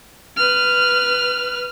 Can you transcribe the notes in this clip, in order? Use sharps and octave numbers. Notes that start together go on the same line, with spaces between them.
B4 F6